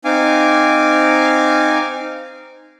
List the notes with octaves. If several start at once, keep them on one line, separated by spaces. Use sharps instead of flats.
C4 D#4 F5 G#5 D6